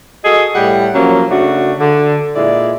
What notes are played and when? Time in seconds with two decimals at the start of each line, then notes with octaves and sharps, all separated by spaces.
0.25 F#4 G#4 A4 D#5
0.56 A2 G3 G4 F#5
0.95 F3 F#3 A#3 C#4
1.31 C#3 A3 D4 F#4
1.80 D3
2.36 A#2 G#3 E4 D5